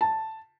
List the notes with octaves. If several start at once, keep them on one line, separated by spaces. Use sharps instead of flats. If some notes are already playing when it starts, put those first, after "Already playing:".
A5